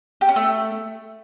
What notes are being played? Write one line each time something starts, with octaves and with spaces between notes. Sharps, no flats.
G4
C#4
A3